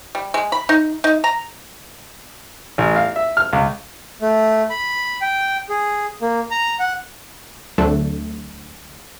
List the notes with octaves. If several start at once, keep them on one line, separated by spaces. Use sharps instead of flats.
G3
G#3
B5
D#4
D#4
A#5
A1
F5
E5
F6
C#2
A3
B5
G5
G#4
A#3
A#5
F#5
D2 F#3 A3 C4 D4 A4